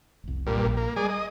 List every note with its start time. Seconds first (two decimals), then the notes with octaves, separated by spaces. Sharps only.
0.24 F1 C2
0.47 G2 A#2
0.65 A#1
0.77 A#3
0.96 G3 G#3 G#4 D5
1.09 D#5